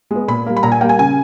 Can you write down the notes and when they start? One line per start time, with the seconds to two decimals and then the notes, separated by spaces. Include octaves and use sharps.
0.11 G#3 B3
0.28 A#2 B5
0.46 G3 A#3
0.57 B5
0.63 A#2 A#5
0.72 G#5
0.81 A#3 G5
0.85 G3 G#5
0.99 C#3 G#5